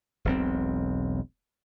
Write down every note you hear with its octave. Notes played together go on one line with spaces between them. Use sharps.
E1 B1 C4